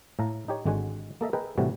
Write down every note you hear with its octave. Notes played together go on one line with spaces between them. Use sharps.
A2 A4 F5 A#5
D#4 G4 C#5
G#1 D3 G#3 F#4 F#5 G#5
A#3 A4 D#5 E5
G#4 A#4 B4 D#5 G5
A2 C3 E3 G3 F#4